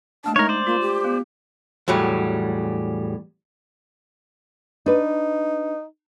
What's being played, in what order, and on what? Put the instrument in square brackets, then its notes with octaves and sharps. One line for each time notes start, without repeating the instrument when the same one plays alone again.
[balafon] A3 A#3 D4 [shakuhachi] A5
[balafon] G#3 [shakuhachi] D#4 [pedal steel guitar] A#4 C#5
[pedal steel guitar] C5 D5
[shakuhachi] A#3 [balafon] F4
[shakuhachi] G4
[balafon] B3
[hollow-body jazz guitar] E2 A2 F#3 G3
[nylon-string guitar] D4 B4 [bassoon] D#4